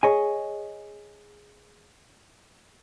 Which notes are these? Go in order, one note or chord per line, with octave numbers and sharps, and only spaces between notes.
G#4 C#5 D#5 G#5